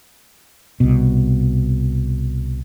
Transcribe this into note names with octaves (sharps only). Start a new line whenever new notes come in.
C2 B2